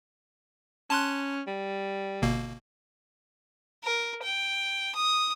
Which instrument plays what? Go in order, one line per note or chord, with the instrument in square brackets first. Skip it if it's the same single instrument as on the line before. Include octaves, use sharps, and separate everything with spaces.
[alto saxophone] C#4 [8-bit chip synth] A5 C6 F#6
[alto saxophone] G3
[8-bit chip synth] G1 B2 A#3
[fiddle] A#4
G5
D#6